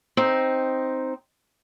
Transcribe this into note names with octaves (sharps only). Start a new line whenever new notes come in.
C4 D#4